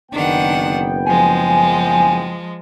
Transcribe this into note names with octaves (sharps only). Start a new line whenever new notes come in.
F#1 D#3 B3 D4 F#5 G5
F3 G#3 G#5